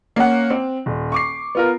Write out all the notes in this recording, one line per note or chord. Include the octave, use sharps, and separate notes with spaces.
A#3 C#4 F#5
C4
D#1
C#6 D6 C7
B3 F4 A#4